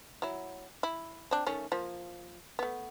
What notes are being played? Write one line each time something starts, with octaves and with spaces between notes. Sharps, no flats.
F#3 E4
E4
C4 D4
D#3 A3 C#4
F3 A#3
A3 B3